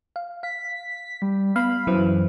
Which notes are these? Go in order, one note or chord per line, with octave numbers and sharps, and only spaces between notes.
F5
F5 B6
G3
B3 F5 B5
F#2 E3 E4 C5